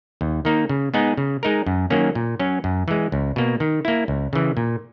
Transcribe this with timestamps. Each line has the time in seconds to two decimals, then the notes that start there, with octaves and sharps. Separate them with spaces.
0.21 D#2
0.45 D#3 A#3 D#4
0.69 C#3
0.94 G#3 B3 D#4 G#4
1.17 C#3
1.43 G#3 D#4 A#4
1.66 F#2
1.90 D#3 F#3 A#3 C#4
2.15 A#2
2.39 F#3 C#4
2.64 F#2
2.88 E3 G#3
3.12 C#2
3.36 B2 A#3
3.60 D#3
3.85 A#3 E4
4.08 C#2
4.33 C#3 E3
4.57 A#2